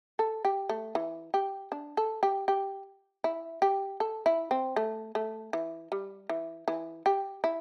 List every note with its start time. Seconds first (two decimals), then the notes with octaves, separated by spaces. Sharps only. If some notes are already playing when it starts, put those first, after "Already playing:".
0.19 A4
0.45 G4
0.69 A3
0.95 E3
1.34 G4
1.72 D4
1.97 A4
2.23 G4
2.48 G4
3.24 E4
3.62 G4
4.00 A4
4.26 E4
4.51 C4
4.76 A3
5.15 A3
5.53 E3
5.92 G3
6.29 E3
6.68 E3
7.06 G4
7.44 E4